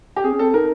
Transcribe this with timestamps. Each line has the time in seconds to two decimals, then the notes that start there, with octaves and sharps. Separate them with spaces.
0.16 G4
0.24 C4 G#4
0.33 C#4
0.39 C4 A4
0.54 D#4 A#4